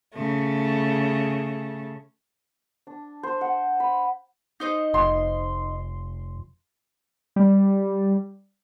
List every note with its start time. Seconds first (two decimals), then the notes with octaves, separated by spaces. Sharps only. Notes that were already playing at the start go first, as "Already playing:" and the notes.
0.15 C#3 A3
2.87 D4
3.23 C5
3.41 F#5
3.80 B5
4.60 D#4 C5 D#5
4.94 F1 C6
7.36 G3